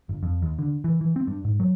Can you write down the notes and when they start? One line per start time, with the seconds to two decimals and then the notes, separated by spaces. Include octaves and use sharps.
0.09 G1
0.23 F2
0.42 D#2
0.59 D3
0.84 E3
1.01 E3
1.16 C4
1.27 G2
1.45 G#2
1.60 F#3